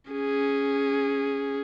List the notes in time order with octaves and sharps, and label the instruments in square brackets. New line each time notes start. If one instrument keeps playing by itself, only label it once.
[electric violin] C#4 G#4